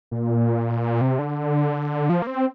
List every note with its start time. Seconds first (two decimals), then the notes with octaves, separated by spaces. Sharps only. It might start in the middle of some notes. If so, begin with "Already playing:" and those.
0.11 A#2
1.01 C3
1.19 D3
2.10 F3
2.22 A#3
2.27 C4